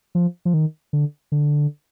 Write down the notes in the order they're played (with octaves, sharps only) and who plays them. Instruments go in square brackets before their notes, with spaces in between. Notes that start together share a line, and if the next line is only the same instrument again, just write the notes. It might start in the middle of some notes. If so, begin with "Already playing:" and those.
[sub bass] F3
F3
D#3
D3
D3